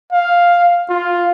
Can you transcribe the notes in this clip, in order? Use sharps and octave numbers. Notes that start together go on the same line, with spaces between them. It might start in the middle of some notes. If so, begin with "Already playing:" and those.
F5
F4